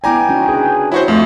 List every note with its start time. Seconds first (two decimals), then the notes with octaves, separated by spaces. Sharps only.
0.04 B3 E4 D5 G5 G#5 A#5 D6
0.29 C#4 D#4 F#4
0.48 D4 G#4 B4
0.92 F#3 E4 F#4 C5
1.08 F2 A3 F4